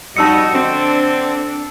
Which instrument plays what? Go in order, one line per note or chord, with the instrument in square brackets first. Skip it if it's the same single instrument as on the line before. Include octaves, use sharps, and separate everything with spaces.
[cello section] F2 F#4 D#5 [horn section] G3 D#4 [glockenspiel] A5 E6 C#7
[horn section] D3 C4 [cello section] D4